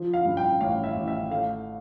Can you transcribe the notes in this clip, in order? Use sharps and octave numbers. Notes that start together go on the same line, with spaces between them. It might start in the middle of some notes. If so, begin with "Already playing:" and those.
Already playing: F3
F5
G2
G5
A1 F5
E5
A1
E5
A3 F5